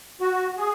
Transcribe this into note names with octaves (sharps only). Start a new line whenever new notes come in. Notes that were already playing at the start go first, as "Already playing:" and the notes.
F#4
G#4